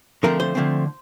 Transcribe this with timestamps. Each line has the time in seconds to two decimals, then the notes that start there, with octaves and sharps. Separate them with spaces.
0.23 D3 F3 A3 C4 A#4
0.40 C5
0.55 D3 F3 A3 C4